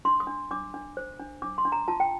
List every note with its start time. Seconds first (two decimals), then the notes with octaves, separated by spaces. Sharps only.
0.05 D4 C6
0.20 D#6
0.27 D4
0.51 D4 D6
0.74 D4
0.97 C5
1.19 D4
1.42 D4 D6
1.58 C6
1.65 D4
1.72 A#5
1.88 F4 A5
2.00 G5